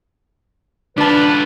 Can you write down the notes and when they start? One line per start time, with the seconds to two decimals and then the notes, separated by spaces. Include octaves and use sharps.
0.98 D3 D4 F4 B4 A5